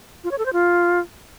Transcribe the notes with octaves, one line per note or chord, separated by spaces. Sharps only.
F4
C#5
A4
C5
F4